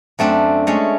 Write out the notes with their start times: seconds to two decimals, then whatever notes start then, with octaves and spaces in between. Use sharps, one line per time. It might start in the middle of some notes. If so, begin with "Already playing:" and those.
0.19 F#2 A3 C4 D4
0.67 G#3 A3 C#4